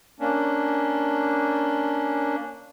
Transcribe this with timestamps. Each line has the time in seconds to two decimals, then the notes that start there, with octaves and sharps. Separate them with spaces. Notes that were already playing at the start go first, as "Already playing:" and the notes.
0.20 A#3 C#4 D4